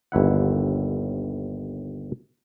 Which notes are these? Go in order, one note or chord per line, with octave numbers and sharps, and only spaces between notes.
G1 D#2 E4 F#5